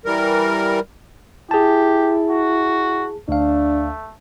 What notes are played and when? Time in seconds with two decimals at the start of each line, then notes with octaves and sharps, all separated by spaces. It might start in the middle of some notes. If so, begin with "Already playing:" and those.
0.05 E3 G3 A#4
1.51 E4 G4 G#4 A5
2.30 F#4
3.29 D2 A3 D4 F5